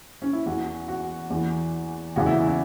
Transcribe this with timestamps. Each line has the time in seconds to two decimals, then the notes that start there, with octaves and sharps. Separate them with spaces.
0.22 C#4
0.33 E4
0.46 E2 E3 F#4
0.88 F#4
1.30 E2 E3
2.16 E2 C#3 E3 F#4
2.26 E4
2.48 E4